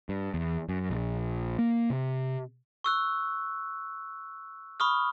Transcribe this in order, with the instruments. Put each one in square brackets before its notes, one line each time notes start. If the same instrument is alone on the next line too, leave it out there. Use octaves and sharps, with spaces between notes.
[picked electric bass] G2
E2
F#2
A#1
A#3
C3
[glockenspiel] C#6 E6 F#6
B5 C#6 D#6 F6